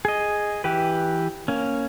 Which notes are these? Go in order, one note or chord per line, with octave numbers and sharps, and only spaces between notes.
G#4 D#5
E3 G4 B4
A#3 C#4